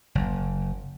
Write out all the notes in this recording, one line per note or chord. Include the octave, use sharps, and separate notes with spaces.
F#1